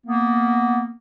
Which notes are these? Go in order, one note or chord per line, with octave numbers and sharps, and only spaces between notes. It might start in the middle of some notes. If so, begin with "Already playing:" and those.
A#3 B3